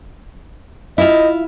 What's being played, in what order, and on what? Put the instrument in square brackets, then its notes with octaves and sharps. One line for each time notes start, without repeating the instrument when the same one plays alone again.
[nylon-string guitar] E4 F4 [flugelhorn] D#5